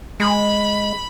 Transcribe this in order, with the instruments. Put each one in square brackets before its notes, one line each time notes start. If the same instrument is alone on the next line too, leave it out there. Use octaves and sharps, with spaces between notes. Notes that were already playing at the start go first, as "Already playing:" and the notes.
[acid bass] G#3 [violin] B5